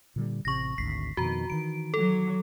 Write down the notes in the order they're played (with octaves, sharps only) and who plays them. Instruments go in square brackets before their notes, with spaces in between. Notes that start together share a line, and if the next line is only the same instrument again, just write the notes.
[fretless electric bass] A#2 D3 G3
[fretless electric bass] A1 C3 [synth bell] C#6 A#6
[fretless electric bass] G#1 D2 [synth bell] B6 C7
[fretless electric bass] F2 B2 D#3 [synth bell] F#4 A#5
[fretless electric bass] D#3 E3 [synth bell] D7
[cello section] F#3 [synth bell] A4